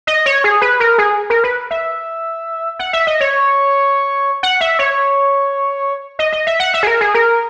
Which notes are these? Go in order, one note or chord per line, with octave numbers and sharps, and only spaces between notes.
D#5
C#5
G#4
B4
A#4
G#4
A#4
B4
E5
F#5
E5
D#5
C#5
F#5
E5
C#5
D#5
D#5
E5
F#5
E5
G#4
A#4
G#4
A#4